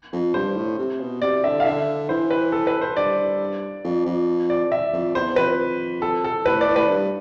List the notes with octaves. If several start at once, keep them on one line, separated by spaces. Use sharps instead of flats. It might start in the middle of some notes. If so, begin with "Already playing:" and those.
F2
G2 C5
A2
C3
B2
C3 D5
D3 E5
F5
D3 E5
E3 C5
B4
A4
B4
C5
G2 D5
F2
F2
D5
E5
F2
E2 C5
F2 B4
A4
A4
A2 B4
D5
A2
B4
G2